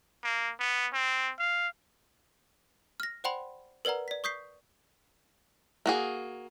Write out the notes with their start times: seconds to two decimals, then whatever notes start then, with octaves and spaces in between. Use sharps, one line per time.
0.24 A#3
0.60 B3
0.93 C4
1.39 F5
3.00 F6 A#6
3.24 C5 D5 F#5 G5 B5 C6
3.85 A#4 B4 D5 F#5 A#5
4.08 D5 B6
4.24 C#6 D#6 G6 B6 C7
5.86 A#3 F#4 G#4